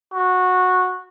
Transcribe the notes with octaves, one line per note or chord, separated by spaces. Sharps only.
F#4